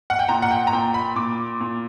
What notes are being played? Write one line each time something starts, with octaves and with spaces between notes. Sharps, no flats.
F#5
G5
A#2 A#5
F#5
G5
A#5
A#2 G5
B5
A#2 D6
A#2